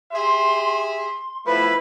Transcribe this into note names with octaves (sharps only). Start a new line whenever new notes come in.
G4 G#4 E5 C6
C6
B2 F3 A3 E4 B4